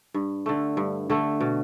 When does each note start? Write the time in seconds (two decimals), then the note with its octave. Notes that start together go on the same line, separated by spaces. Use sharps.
0.14 G2
0.46 D3 A3
0.77 G2
1.10 D3 A3
1.41 B2